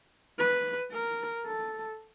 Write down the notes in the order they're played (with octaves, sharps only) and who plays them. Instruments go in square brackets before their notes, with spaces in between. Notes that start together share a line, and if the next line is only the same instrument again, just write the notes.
[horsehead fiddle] B4
A#4
A4